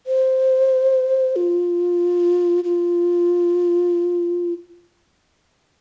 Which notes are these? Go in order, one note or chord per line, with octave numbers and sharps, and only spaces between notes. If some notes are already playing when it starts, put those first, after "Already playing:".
C5
F4
F4